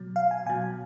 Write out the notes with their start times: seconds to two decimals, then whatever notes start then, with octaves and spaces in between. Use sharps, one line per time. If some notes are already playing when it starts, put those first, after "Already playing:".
Already playing: B2 F#3
0.16 F5
0.31 G#5
0.46 B2 F#3 G#5